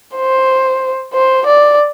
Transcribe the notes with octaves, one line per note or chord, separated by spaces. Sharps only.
C5
C5
D5